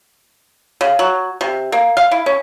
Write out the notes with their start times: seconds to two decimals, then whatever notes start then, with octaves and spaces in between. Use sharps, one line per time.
0.81 C#3
0.99 F#3
1.41 C3
1.72 A#3
1.97 F5
2.11 E4
2.26 C#4